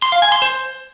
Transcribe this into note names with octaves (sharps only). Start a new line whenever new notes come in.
C6
F5
G#5
C6
C5